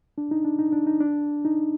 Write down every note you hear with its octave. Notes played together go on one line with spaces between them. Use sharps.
D4
D#4
D4
D#4
D4
D#4
D4
D#4